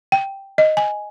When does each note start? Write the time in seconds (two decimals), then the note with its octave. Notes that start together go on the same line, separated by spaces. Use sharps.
0.12 G5
0.58 D#5
0.77 G#5